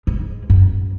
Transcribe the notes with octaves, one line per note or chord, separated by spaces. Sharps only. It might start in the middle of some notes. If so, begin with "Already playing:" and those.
G#3
F#2